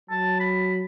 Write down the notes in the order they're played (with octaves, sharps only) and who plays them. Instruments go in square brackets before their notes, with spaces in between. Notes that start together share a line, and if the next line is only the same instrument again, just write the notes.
[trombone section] F#3 [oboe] A5
[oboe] B5